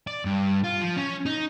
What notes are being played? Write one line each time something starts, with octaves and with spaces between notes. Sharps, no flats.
D5
G2
F4
F3
C#4
D#4